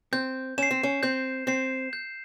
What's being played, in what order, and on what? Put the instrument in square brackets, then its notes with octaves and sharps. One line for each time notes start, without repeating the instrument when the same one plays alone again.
[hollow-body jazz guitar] C4 [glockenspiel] G6
[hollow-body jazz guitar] C#4 [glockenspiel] C7 E7
[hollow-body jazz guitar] C4
C#4
[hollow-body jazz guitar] C4 [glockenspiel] G6
[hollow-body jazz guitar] C4 [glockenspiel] C7 E7
[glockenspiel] G6